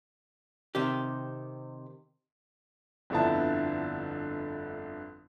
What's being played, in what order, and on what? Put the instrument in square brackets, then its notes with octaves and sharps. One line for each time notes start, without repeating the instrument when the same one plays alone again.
[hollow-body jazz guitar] C3 D#3 G4
[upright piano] G1 F2 D3 B3 E4 A5